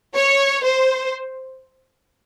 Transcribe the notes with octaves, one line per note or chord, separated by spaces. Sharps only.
C#5
C5